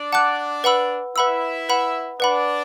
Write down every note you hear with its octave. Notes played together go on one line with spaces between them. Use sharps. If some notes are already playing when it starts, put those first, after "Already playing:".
Already playing: D4 D5
F#5 A5 D6 F#6
B4 F#5 B5 E6
E4 B4 E5 F#5 B5 E6
B4 F#5 B5
D4 B4 D5 F#5 B5